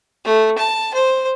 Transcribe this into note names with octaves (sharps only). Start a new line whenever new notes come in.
A3
A5
C5